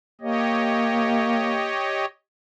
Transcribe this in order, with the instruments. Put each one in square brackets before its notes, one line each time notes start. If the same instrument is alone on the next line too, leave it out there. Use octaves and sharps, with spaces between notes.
[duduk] A#3 [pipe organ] G4 C#5 D#5